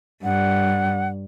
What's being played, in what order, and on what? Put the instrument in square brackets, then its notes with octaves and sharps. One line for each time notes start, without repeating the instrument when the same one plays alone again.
[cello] G2 [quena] F#5